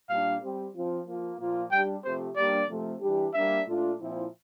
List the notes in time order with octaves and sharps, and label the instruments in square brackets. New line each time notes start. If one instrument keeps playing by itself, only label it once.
[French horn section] A#2 G3 A#3 D4 [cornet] F5
[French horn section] G3 C4 G4
F3 C4 F4
F3 A#3 F4
A#2 F3 A#3 F4
[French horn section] G3 D4 G4 [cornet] G5
[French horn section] C3 F3 A3 C4 G4 [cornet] C5
[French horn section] G3 A#3 D4 [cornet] D5
[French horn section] C3 F3 A3
E3 G3 D4 G4
[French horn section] G3 A#3 D4 [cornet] E5
[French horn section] A#2 A3 D4 F4
A#2 F3 C4 E4